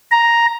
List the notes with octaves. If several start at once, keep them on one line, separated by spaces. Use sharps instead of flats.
A#5